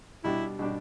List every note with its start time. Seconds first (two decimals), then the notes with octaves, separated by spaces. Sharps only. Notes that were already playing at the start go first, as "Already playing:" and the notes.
0.24 B2 G3 D4 E4 G4
0.59 B2 G3 D4 G4